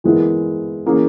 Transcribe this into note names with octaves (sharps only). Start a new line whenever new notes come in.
E3 G#3 B3 E4 A#4
E3 A#3 C#4 G#4